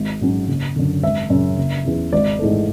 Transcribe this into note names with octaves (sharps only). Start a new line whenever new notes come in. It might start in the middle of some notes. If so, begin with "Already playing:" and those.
Already playing: G#1
G#2 F#3 C#4
F#1
F#2 D3
G#1 E5
F#2 C#3
F#1
E2 C#3
G#1 D5
G#2 E3 A3